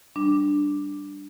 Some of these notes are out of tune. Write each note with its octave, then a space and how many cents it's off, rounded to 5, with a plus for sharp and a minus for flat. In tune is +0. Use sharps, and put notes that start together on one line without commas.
G3 +0 D4 +0 D6 +0